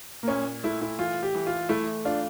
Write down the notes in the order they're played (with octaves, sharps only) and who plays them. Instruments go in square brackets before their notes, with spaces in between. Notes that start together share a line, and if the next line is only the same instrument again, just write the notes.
[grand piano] A#3
[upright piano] A#2 [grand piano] C#4
[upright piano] A3 [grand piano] E4
[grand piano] E4
[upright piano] E3 [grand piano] F4
[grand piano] G4
[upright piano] E3
[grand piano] F4
[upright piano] A3 [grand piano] E4
[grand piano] D4 [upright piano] F4